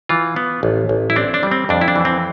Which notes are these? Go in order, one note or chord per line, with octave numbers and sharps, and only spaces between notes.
E3 F4
B3
A1
A1
E4
C4 D4
D4
G3
C4
F2 D4
E4
D4
E3
C4